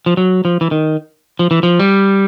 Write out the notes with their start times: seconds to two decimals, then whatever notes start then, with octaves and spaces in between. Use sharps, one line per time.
0.06 F3
0.17 F#3
0.45 F3
0.61 E3
0.71 D#3
1.39 F3
1.51 E3
1.63 F3
1.80 G3